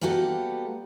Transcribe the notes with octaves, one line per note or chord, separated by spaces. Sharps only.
G3 A#3 B3 F#4 G4 A4